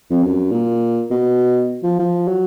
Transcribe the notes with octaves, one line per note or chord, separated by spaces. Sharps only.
F2
F#2
A#2
B2
F3
F3
F#3